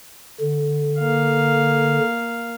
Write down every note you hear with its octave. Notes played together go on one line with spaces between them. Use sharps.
D3
A#3 F5